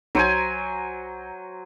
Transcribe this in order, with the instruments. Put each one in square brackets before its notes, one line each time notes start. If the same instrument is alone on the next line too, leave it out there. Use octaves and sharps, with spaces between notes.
[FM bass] B1 [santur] F#3 C5 G#5